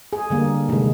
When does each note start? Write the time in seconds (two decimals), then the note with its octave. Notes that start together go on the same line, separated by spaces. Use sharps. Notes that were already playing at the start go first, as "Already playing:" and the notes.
0.13 G#4
0.30 D3 G3 A#3
0.69 C3 D#3 G#3